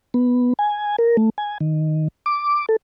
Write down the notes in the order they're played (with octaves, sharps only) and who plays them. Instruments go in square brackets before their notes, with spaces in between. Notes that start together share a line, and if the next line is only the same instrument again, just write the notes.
[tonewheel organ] B3
G#5
A#4
A3
G#5
D#3
D6
A4